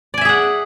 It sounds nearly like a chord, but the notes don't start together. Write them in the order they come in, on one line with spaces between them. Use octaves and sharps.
D5 G#5 E5 G#4 F#5